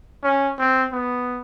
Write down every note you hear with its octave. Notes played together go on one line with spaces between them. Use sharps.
C#4
C4
B3